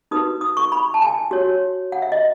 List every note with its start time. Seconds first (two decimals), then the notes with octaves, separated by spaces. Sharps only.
0.11 D#4 F#4 B4 D#6
0.41 D#6
0.57 C#6
0.72 B5
0.94 A5
1.02 G#5
1.31 F#4 C#5
1.92 F#5
2.02 E5
2.12 D#5